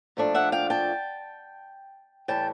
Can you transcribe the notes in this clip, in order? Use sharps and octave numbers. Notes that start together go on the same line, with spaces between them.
A#2 F3 A3 D4
E5 F#5
F5 G5
G5 A5
A2 E3 G3 G5 A5